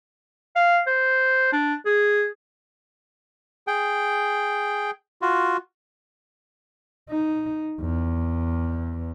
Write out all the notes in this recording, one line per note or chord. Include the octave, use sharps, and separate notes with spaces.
F5
C5
D4
G#4
G#4 G5
F4 F#4
D#4
E2